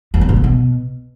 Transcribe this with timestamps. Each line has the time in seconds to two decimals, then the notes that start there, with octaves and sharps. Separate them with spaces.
0.14 E2
0.21 G2
0.29 A#2
0.36 D3
0.44 B2